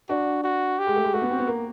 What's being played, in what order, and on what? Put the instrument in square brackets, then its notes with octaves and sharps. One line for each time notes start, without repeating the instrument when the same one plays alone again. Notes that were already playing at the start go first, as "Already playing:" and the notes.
[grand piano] D4 [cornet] F#4
[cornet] F#4
G4
[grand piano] G#3
A3
G#3
[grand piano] A3 [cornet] F#4
[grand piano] B3
C4
B3
A#3